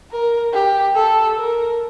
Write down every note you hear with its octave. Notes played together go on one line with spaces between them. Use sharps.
A#4
G4
A4
A#4